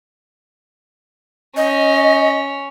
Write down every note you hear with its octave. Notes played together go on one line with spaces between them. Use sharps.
C#4 D#5